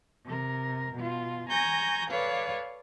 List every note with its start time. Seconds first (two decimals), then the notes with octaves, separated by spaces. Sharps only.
0.24 C3 A#4
0.94 B2 F4
1.49 G#5 A#5 C#6 G6 A#6
2.10 A4 B4 C#5 D5 F5